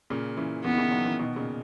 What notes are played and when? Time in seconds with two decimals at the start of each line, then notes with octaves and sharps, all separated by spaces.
0.10 A#2 C#3
0.37 C#3 E3
0.64 C#3 E3 B3
0.73 D#3
0.78 C#3 E3
0.91 D#3 F#3
1.05 C#3 E3
1.19 B2 D#3
1.36 A#2 C#3